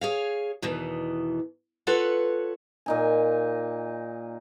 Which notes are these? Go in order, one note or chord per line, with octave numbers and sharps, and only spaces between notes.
G#4 C#5 F5
E2 B2 D#3 E3
F4 A4 B4 C#5 F#5
A#2 D#4 G#5